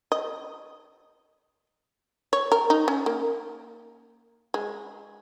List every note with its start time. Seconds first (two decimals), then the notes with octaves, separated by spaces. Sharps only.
0.12 D#5
2.33 C#5
2.52 A#4
2.70 D#4
2.88 C#4
3.06 A#3
4.54 G#3